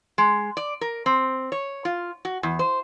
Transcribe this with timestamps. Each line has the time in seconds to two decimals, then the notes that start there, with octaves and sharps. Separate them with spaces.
0.18 G#3
0.57 D5
0.81 A#4
1.06 C4
1.52 C#5
1.85 F4
2.25 F#4
2.43 E2
2.59 C5